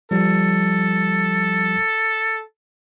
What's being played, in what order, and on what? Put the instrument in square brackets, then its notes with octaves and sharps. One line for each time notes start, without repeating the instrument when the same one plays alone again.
[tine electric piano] F3 G3 [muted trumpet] A4